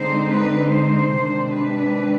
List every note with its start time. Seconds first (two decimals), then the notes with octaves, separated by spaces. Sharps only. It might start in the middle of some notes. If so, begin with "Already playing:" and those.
Already playing: D3 G#3 C4 D#4 C5
0.32 B4
0.73 C5
1.14 C3 D#3 G#3 D4
1.55 B4